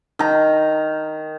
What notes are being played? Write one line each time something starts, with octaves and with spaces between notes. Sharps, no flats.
D#3 A#5